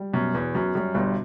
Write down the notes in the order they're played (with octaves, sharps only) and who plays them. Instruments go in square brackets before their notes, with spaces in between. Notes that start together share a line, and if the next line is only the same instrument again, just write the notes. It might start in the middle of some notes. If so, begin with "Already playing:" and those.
Already playing: [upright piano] G3
[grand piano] F#2 [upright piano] B2
[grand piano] E2 [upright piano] B3
[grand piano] F#2 [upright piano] F#4
[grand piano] F#2 [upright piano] G3
[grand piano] G1 G2 [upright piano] B2